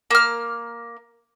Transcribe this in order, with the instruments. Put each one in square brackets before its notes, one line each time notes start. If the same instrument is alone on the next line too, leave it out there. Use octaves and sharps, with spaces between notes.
[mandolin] A#3 F6